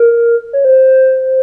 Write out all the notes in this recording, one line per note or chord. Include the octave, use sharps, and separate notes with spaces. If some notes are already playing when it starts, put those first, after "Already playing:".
Already playing: A#4
C#5
C5